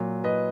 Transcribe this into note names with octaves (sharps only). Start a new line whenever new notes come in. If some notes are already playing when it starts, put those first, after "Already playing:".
Already playing: A#2 F#3
B4 D#5